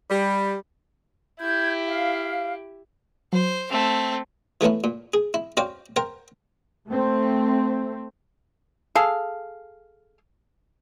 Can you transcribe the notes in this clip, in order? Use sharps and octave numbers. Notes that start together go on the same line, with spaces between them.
G3
E4 G4 G6 G#6
F5
F#3 C5
A3 C4
E3 A3 B3 C#4 E4
A#2
G#4
E4
C#4 F#4 C5 D5 F5 G5
A#4 C5 F#5 G5
A3 C4
G#4 A4 F5